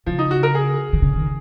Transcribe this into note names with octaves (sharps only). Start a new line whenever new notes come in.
C#3 F3
D#4
F#4
A#4
G#4
D#3
C#3
D#3